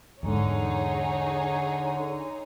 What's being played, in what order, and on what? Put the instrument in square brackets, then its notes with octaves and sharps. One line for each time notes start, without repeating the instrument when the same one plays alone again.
[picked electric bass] E2 G#2 [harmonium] D3 [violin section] D#4 G#4 C#5